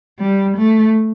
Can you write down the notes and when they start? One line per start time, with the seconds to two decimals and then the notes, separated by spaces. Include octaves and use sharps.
0.19 G3
0.57 A3